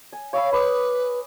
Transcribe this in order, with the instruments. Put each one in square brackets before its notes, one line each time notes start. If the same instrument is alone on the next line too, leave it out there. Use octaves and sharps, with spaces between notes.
[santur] G#5
[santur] C#5 E5 B5 [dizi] F5
[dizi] B4 [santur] B5 D6 D#6